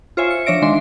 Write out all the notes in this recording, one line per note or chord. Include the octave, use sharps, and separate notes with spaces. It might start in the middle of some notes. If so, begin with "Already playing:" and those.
F4 C5 C#5 E5 G#5
C#7
F3 D4 C#5 E5 A#6 D7
D#3 G#3 D4 C6